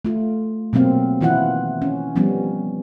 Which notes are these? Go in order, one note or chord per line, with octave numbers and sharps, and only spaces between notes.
A3 F4
B2 F#3 A#3 C4 F5
D#3 E3 E4 F4 F#5
C#4
F3 G3 B3 C#4